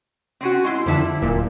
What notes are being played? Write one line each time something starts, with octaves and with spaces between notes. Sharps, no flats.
C4 C#4 F#4
G#3 E4 C6
F2 D3 G3 E4 A5
D1 A#2